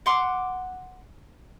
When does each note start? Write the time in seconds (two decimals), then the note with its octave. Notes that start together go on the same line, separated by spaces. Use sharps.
0.06 F#5 C6 D6